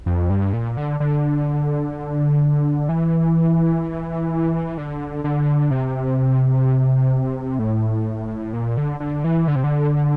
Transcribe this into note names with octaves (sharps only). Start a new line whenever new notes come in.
F2
G2
A#2
D3
D3
E3
D3
D3
C3
A2
A#2
D3
D3
E3
D3
C3
D3